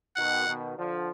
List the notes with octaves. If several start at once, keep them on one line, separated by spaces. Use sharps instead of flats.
B2 D#3 F#5
B2 D#3
D3 F3